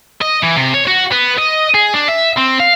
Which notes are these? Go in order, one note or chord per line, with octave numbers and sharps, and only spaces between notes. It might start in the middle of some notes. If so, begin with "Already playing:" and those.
D#5
E3
C3
C#5
F#4
B3
D#5
G#4
D4
E5
C4
F5